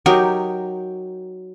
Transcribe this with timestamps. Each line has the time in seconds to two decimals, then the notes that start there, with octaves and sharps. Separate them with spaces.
0.06 F#3 D#4 G4 A#4